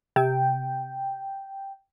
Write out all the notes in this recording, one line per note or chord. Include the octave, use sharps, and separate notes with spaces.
C3 G5